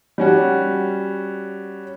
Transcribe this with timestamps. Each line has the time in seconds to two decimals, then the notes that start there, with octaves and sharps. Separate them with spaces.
0.18 G3 C#4 F#4